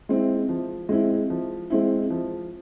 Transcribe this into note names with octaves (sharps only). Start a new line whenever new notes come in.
G#3 C4 E4
F3
G#3 C4 E4
F3
G#3 C4 E4
F3